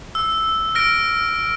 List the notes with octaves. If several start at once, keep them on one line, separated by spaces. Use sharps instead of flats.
E6
F6 A#6 D7